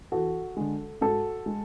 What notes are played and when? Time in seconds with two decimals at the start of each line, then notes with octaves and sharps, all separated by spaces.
0.12 E2 F#4 A4
0.57 D3 G#3
1.01 G#2 F#4 A4
1.46 G#3